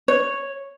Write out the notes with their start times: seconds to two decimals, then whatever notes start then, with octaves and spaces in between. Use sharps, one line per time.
0.08 C#5